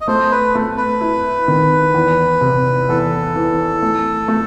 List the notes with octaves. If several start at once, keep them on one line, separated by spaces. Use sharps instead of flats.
D#5
A3 C5
B4
A3
B4
E4
D#3
E2
C3
E2 A4
E3
A3
A3